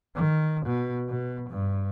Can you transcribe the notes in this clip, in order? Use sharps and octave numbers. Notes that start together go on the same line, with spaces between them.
D#3
B2
B2
G2